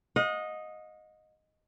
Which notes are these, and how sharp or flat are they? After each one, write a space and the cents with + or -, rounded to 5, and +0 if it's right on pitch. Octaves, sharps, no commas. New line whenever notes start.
D#5 +0 F#5 -45